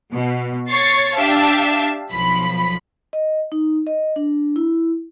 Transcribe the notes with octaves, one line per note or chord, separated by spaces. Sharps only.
B2
C#5 C#6 A6 C7 C#7
D4 G4 E5 F5 A5
B1 F3 B5 B6
D#5
D#4
D#5
D4
E4